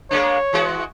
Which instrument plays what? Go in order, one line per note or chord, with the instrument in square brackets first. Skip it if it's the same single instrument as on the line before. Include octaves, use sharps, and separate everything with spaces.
[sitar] G#3 A#3 D4 [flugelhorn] C#5
[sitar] E3 G#3 F#4